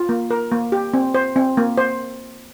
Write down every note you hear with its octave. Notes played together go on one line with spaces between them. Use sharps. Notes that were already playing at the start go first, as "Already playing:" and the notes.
Already playing: F4
A#3
A#4
A#3
G4
C4
C5
C4
A#3
C5